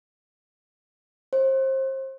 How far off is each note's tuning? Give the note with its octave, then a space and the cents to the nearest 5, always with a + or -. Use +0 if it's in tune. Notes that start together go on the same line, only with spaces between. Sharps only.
C5 +30